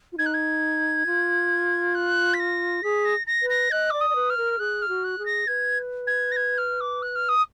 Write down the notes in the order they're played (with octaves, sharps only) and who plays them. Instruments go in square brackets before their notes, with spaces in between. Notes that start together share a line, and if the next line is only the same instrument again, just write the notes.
[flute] F4
[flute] D#4 [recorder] G#6
[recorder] F#6
G#6
[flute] F4
[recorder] F#6
B6
A#6
[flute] G#4 [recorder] B6
[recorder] A#6
A#6
[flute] B4
[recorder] A#6
[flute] D#5 [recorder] F#6
[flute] D5 [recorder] D6
[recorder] D#6
[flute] D5
B4
[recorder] F6
[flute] A#4
[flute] G#4 [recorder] F#6
[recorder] F6
[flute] F#4
[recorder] F#6
[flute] G#4
[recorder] A#6
[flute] B4 [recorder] G#6
[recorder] G#6
A#6
G#6
F6
D6
F#6
F6
D#6